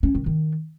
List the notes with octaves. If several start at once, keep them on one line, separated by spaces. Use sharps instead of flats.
C#4
D#3
D#3